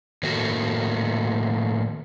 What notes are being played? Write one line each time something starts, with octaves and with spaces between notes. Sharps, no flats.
A2 D#3 A3 A#3 F#4